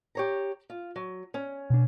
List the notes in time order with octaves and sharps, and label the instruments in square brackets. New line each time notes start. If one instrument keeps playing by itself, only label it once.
[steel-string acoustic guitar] G4 C#5 A#5
F4
F#3
C#4
[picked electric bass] B2 D4